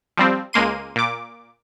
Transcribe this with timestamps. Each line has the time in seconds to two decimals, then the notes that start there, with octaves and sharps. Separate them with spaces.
0.18 F3 G3 C4
0.53 C#2 G#3 A#3 C6 D#7
0.96 A#2 D6